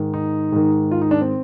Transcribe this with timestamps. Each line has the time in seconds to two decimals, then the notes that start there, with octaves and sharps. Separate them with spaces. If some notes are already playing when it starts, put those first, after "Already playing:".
Already playing: G#2 D#3
0.14 D#4
0.52 G#2 D#3
0.91 F4
1.02 D#4
1.11 D4
1.21 C4